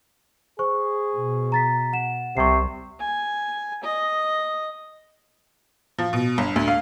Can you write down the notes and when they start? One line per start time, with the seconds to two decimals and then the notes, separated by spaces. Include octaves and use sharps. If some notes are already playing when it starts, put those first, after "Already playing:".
0.59 G#4 C5 C#6
1.14 B2
1.52 A#5 A6 B6
1.93 F#5 E7
2.37 C2 C3 C#6 C7
2.99 G#5
3.83 D#5
5.98 F3
6.13 B2
6.38 G1
6.56 D2
6.68 F5